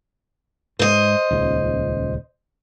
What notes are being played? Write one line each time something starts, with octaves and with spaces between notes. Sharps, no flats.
G#2 G#3 C5 D#5
D#1 C#2 C#3